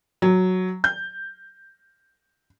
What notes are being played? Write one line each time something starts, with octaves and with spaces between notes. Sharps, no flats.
F#3
G6